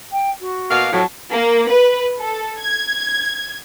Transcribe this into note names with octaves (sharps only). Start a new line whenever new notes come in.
G5
F#4
B2 A#3 F5
F2 A2 F#3 A5
A#3
B4
A4
G#6